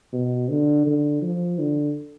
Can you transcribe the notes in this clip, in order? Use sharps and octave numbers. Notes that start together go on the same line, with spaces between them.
B2
D3
D3
F3
D3